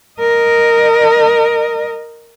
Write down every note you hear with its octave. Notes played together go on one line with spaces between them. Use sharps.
A#4 D#5